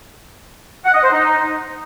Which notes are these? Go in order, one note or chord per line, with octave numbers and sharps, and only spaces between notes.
F#5
D#5
C5
D#4